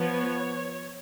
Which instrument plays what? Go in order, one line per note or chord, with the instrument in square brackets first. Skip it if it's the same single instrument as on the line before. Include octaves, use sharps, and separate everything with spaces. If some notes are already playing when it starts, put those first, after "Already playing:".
Already playing: [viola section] F3 B3 C#5